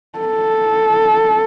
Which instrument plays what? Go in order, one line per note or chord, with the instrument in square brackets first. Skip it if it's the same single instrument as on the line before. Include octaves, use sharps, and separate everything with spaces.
[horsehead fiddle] A4